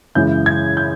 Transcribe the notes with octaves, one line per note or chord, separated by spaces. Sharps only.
F#2 C#3 E3 G#3 G6
G#6
G6